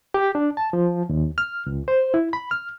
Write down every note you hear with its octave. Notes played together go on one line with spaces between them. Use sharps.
G4
D4
A5
F3
D#2
F6
C#2
C5
E4
B5
F6